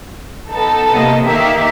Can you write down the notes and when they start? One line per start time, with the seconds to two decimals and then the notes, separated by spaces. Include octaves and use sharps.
0.50 B3 D#4 A4
0.91 C3 A#3 D#5
1.24 D#3 A#3 G4 E5